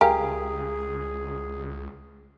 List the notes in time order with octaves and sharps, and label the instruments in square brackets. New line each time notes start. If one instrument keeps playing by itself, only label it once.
[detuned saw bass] C#2 [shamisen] G4 A#4 [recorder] G#4 [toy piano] F5 G#5